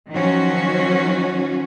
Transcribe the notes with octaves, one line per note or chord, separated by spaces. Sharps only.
D#3 F3 F#3 C#4 F#4